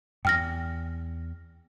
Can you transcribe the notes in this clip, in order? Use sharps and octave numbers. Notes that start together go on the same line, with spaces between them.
E2 G5 F6 A#6